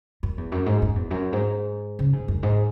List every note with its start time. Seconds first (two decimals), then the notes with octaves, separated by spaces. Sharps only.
0.23 F#2
0.38 E2
0.52 F#2
0.66 G#2
0.82 F#2
0.95 E2
1.11 F#2
1.33 G#2
1.99 C#3
2.13 G#2
2.28 F#2
2.43 G#2